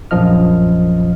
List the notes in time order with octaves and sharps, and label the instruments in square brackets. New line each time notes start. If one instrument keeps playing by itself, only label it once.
[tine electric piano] A#1 F#2 F3 D#5 F6